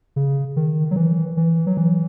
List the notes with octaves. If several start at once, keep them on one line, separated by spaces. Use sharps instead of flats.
C#3
D#3
F#3
E3
E3
F#3
E3